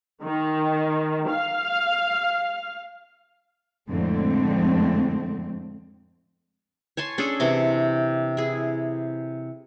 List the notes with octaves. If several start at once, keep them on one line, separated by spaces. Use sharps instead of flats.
D#3
F5
F2 A2 D3 G#3 C4
C#5 G#5 A5 C6
C#4 D4 G#4 A4
C3 E3 C4
E4 G#4